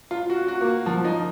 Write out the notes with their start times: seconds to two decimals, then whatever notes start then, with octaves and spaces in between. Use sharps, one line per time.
0.11 F4
0.30 F#4
0.48 F#4
0.61 A#3
0.86 F3
1.04 D#4